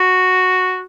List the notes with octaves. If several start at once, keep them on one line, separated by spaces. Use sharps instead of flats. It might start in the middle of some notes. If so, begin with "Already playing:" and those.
Already playing: F#4